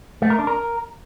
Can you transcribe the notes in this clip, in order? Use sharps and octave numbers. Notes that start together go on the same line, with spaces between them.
A3
A#4
D4
A#4